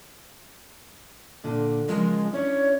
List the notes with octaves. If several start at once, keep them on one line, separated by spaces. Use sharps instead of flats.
A#2 D3
C#3 F3 G#3 A#4
C#4 D4 E4 C#5